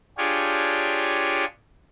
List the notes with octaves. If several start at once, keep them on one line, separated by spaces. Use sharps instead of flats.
D4 F4 G4 G#4 C#5